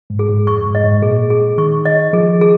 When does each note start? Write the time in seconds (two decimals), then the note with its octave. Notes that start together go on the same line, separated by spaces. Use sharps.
0.10 G#2
0.19 G#4
0.29 G#2
0.47 F2 C#6
0.66 G#2
0.75 D#5
0.84 G#2
1.02 A#2 G#4
1.30 G#4
1.58 D#3 C#6
1.85 D#5
2.13 F3 G#4
2.41 G#4